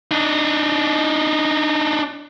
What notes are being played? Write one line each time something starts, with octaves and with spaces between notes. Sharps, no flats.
D4 D#4